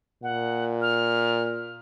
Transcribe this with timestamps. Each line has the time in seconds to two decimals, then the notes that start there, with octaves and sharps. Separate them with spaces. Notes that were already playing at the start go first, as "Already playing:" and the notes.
0.23 A#2 F#5
0.81 F6